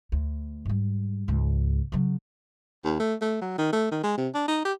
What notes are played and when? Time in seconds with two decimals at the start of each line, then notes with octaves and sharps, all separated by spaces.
0.12 D2
0.66 G#2 G3
1.28 C#2 G#2
1.92 C#3 F#3
2.85 D#2
3.00 A3
3.21 A3
3.41 F#3
3.58 D#3
3.73 A3
3.92 D#3
4.03 G#3
4.18 C3
4.34 D4
4.48 D#4
4.65 G4